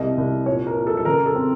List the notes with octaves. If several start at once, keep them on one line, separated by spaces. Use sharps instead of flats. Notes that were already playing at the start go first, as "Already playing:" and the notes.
Already playing: C2 C3 D#5
C2
A#2 C#5
A#4
A#2
A4
A4
C#3 A#4
A4
C4